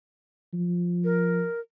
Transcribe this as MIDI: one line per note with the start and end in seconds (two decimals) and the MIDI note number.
0.53 1.45 53
1.04 1.60 70